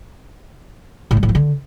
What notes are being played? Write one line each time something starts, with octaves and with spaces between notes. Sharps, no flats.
A2
G3
A2
F3
D3